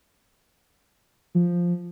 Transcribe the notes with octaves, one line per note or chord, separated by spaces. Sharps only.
F3